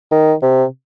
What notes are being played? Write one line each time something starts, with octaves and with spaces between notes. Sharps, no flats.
D#3
C3